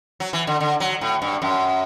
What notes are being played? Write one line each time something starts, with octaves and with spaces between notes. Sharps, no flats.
F#3
E3
D3
D3
F#3
A2
G2
F#2